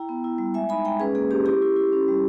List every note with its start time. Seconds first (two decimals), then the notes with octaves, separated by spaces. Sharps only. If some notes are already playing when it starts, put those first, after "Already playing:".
Already playing: E4 G5 A#5
0.09 B3
0.24 E4
0.38 G3
0.54 G#3 E5 G#5
0.69 D#4 G#5 B5
0.85 G#3 G5 A#5
1.00 C#4 G#4 B4
1.15 A#3 G#4
1.31 C#4 G4
1.46 E4 G4
1.62 E4
1.76 E4
1.93 C#4
2.08 G3